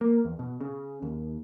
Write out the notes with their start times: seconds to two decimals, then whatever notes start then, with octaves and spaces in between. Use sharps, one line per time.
0.01 A#3
0.25 E2
0.39 B2
0.61 C#3
1.02 D#2